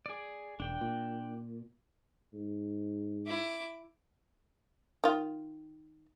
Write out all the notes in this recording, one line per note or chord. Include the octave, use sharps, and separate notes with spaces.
G#4 D5
E1 D4 G5
A#2
G#2
E4 D6
D#3 F4